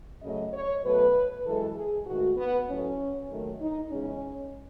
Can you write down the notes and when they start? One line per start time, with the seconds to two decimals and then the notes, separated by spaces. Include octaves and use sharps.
0.22 F#2 C#3 F#3 A3 D#5
0.53 C#5
0.84 B2 F#3 A3 B4
1.45 F#2 E3 G#3 A4
1.76 G#4
2.07 G#2 D#3 A3 F#4
2.37 B3
2.68 A2 F#3 A3 C#4
3.30 D#2 D#3 F#3 A3
3.61 D#4
3.91 E2 C#3 G#3 C#4